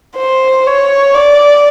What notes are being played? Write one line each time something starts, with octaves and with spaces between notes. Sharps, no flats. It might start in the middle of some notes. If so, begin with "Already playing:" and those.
C5
C#5
D5